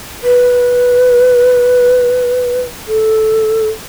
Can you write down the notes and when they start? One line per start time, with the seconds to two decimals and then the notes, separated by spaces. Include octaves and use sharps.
0.23 B4
2.88 A4